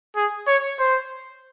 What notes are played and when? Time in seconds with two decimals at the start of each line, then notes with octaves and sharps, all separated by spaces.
0.16 G#4
0.47 C#5
0.79 C5